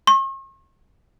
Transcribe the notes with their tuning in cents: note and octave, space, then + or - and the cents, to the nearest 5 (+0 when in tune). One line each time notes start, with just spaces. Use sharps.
C#6 -45